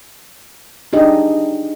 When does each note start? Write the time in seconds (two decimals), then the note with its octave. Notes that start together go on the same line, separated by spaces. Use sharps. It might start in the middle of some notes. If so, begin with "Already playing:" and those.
0.93 D4 D#4 G4 G#4 D#5